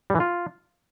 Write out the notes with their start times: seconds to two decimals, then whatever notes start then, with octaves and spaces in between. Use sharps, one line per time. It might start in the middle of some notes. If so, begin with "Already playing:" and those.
0.10 G3
0.15 E3
0.20 F4